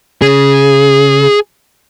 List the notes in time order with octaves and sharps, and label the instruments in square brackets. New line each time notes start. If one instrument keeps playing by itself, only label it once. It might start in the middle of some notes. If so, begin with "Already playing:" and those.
[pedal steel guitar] C#3 [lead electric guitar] G#4